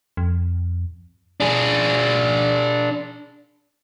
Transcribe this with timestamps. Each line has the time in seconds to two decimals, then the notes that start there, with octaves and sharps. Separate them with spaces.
0.17 F2
1.40 D4 G#4